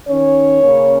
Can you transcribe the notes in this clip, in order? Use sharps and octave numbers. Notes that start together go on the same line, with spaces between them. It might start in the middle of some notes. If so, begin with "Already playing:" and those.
D#3 C#4 C#5
C#3 A#3 C#4